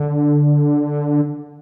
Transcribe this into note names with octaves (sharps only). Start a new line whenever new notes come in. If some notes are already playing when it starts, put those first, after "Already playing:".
Already playing: D3